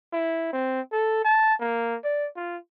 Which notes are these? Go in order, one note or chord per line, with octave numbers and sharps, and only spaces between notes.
E4
C4
A4
A5
A#3
D5
F4